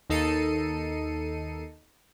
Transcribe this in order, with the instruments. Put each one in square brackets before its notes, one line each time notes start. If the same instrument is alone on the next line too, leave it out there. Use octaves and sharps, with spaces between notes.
[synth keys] D#2 D#4 A4 C7 C#7 D#7